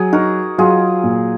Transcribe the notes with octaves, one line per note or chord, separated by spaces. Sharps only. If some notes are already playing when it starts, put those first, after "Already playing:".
Already playing: F#3 G#4
D#4 F#4 A#4
F#3 F4 G#4
A#2